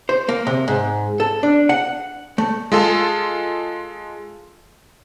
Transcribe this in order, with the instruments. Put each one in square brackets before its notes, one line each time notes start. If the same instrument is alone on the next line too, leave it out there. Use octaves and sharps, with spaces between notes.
[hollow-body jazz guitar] C5
A#3
C3
G#2
A4
D4
F#5
A3
[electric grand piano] G#3 F4 A4